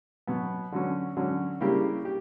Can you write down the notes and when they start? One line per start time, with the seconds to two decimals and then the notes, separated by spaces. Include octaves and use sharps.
0.27 B2 F#3 B3
0.72 D3 F#3 C#4
1.17 D3 F#3 C#4
1.60 C#3 G3 A#3 E4 G4
2.05 G4